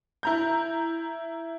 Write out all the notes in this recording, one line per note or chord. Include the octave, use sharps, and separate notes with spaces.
E4 A#5 G6